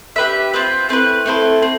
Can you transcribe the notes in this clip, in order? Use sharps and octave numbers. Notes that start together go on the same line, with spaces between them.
D4 G4 B4 E5
C4 F4 B4 E5
A3 C4 E4 B4
A3 C4 E4 A4
C4